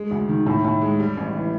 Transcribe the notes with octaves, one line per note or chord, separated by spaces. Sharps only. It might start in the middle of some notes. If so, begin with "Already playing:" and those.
Already playing: G#3
D2
D#3
A2
A2
G#3
G3
A1
E3